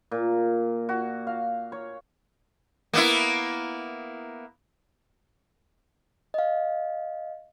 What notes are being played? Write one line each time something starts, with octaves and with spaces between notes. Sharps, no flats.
A#2
F#4
F5
C#5
A#3 B3 E4
D#5 F5